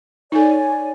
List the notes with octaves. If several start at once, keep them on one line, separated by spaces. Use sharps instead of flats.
D#4 A4 C#5 D5 G#5